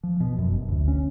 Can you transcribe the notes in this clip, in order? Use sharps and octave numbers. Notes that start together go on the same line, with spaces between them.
F3
B2
F#2
G1
D2
C#4